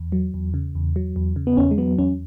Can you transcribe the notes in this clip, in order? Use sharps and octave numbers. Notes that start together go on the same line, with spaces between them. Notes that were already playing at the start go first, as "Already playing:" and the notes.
Already playing: E2
F#3
E2
C#3
E2
F#3
E2
C#3
B3
E2 C#4
G#3
F#3 B3
E2 C#4